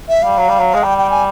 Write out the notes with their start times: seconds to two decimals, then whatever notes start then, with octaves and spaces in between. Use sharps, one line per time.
0.09 E5
0.22 G3 F5
0.38 F#3
0.49 G3
0.59 F#3
0.74 G#3
0.82 G3 G5
0.98 G5
1.11 G#5